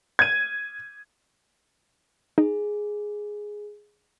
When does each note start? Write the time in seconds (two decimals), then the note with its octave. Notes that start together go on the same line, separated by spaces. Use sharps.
0.19 G#6 D#7
2.38 D#4 G#4